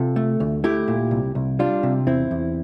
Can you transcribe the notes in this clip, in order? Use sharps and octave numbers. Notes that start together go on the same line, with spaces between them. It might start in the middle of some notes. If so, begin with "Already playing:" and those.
Already playing: C3 F4 A4
A3
D2
A3 E4 G4
A#2
C2
C2
G3 D4 F4
C3
E2 C4 E4
E2